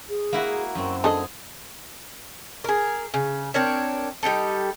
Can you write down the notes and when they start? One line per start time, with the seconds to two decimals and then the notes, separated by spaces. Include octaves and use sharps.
0.09 G#4
0.33 A#3 E4 F#4
0.75 F#2 C4 C#6
1.04 D4 G#4 A4 D#5 A5
2.64 G#4 A#4
3.14 C#3
3.54 C4 D4 A#4 C#5
4.23 G3 D#4 G4 A4